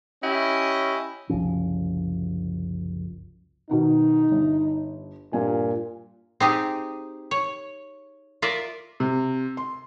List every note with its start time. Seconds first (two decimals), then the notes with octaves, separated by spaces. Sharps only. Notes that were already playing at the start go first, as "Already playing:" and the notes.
0.23 C#4 E4 G4 D#5
1.29 F#1 C2 F3 C#4
3.69 B2 D#3 B3 D#4
4.31 G1
5.33 G2 A#2 G#5
6.40 C4 D#4 G4 G#4
7.31 C#5
8.42 F4 A#4 D5 E5
9.00 C3
9.57 C6